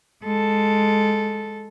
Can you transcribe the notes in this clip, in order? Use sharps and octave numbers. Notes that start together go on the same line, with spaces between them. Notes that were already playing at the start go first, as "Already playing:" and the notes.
G#3 A4